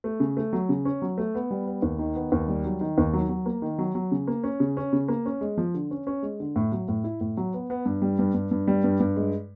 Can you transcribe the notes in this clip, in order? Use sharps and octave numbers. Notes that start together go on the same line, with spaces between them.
A3
C#3
A3
F#3
C#3
C#4
F#3
A3
B3
G3
B3
D#2
D#3
B3
D#2
G3
F#3
D#3
D#2
F#3
F#3
A#3
D#3
F#3
F#3
C#3
A#3
C#4
C#3
C#4
C#3
A#3
C#4
G#3
F3
D3
C#4
C#4
G#3
D3
A2
F#3
A2
E4
A2
F#3
B3
B3
G2
G3
G2
G2
G2
G3
G2
G2
G#3